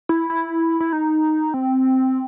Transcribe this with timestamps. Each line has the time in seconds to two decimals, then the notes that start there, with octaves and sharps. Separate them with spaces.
0.09 E4
0.30 E4
0.80 E4
0.93 D#4
1.54 C4